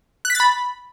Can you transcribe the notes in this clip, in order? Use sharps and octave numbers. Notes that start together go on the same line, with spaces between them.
F#6
B6
A6
B5